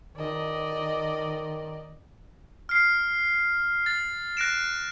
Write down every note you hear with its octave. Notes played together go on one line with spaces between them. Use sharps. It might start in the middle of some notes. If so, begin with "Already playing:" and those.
D#3 D5 D#5
F6 C7
A6
F#6 A#6 D7 E7